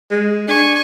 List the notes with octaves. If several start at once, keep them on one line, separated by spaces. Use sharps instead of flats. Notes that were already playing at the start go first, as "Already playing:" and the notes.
G#3
D4 G#5 C#6